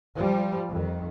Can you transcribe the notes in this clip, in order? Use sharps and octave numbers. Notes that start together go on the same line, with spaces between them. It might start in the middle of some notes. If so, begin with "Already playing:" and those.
F3 G3
F2 D#3